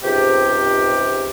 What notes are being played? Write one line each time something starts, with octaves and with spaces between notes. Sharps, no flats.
C#2 G#2 C3 G4